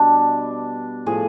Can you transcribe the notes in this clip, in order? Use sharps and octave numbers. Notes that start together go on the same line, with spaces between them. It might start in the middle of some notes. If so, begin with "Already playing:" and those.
Already playing: B2 G3 D4
A2 F3 A3 G#4